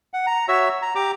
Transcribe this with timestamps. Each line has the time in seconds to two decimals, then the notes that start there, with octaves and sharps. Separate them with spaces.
0.14 F#5
0.27 A#5
0.48 F#4 C#5 E5 E6
0.82 A#5
0.95 G4 A#5 D6